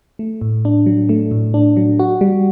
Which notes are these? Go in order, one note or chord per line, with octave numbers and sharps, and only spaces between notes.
A3
A2
D4
F#3
A3
A2
D4
F#3
F#4
G3